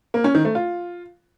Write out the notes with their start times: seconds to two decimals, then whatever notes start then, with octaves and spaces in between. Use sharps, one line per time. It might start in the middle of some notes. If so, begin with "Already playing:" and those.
0.14 A#3
0.24 C#4
0.35 D#3
0.45 A3
0.55 F4